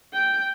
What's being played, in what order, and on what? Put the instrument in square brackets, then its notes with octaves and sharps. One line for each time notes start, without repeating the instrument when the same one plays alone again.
[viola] G5